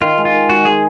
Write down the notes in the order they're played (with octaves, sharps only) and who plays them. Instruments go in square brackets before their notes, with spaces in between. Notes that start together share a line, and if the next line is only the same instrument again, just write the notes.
[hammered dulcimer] D#3 [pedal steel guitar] F4
[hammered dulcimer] G#3
[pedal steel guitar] F4
[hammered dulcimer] D#3
[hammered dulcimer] G#3 [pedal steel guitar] F#4
[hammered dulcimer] G#3 [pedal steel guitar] G#4